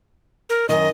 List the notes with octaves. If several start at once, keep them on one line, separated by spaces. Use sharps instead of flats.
A#4
F#2 D#3 D#5